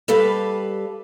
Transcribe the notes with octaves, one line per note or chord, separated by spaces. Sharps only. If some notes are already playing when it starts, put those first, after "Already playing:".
G3 G4 A4 B4 F5